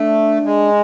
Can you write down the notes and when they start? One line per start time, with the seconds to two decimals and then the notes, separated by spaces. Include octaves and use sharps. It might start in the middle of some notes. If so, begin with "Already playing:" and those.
Already playing: A3 D4
0.45 G#3